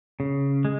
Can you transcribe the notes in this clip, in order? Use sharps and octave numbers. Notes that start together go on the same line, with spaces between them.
C#3
G#3